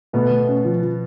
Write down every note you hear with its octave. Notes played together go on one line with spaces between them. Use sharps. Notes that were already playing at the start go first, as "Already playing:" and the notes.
B2 A3 B3
A3
C#4
F3
F3